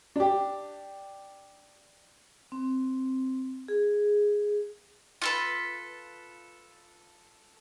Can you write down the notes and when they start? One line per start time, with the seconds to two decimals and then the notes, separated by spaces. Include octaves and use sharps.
0.16 D4 G4
2.52 C4
3.68 G#4
5.22 F4 A4 B4